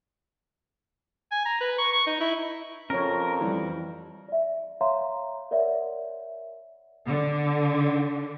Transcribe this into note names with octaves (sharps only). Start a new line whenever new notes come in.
G#5
A#5
B4
C#6
C#6
D#4
E4
F2 F3 C#4 A#4 C#5
E3 G3
D5 E5
C#5 E5 F5 A#5 C6
A#4 C#5 D5 E5 F#5
D3